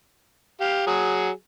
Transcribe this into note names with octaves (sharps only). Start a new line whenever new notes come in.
G4 F5
F#3 G#4